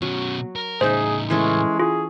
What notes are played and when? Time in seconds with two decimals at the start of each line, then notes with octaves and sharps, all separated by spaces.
0.02 B2 F#3 C#4
0.56 A#4
0.81 A2 C#3 D#4 G#4 C5 E5
1.30 E3 G#3 C#4 A4
1.80 F4 G#4